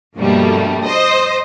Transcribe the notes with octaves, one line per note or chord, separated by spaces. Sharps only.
G2 B2 F3 G3 A3 A#3
C5 D#5 D#6